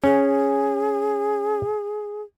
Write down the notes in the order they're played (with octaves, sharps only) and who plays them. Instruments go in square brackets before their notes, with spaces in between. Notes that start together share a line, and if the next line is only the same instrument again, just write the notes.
[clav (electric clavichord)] C#4 [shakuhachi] G#4